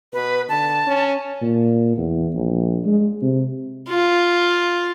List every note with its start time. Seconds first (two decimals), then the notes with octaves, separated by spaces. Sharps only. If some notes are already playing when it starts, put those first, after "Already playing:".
0.13 B2 B4
0.49 D3 A5
0.87 C#4
1.41 A#2
1.97 E2
2.34 A#1
2.86 G#3
3.22 C3
3.89 F4